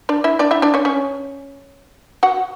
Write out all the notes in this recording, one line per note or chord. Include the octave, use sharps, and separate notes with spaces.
D4 D5
E4 E5
D4 D5
E4 E5
D4 D5
C#4 C#5
C#4 C#5
F#4 F#5